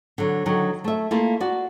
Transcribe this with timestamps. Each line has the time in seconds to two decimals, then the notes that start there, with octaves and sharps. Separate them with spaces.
0.18 D3 F#3
0.46 D3 D#3 F#3
0.84 A3 E5
1.11 A3 A#3 E4 F4
1.40 F#4 D5